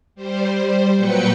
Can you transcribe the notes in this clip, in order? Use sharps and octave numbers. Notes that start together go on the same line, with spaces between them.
G3 C5
A#2 F#3 B4 G5 G6 C#7